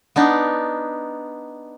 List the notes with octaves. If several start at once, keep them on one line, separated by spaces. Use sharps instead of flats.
B3 D4 D#4